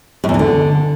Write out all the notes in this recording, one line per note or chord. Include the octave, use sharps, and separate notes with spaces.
F#2
E2
E3
D3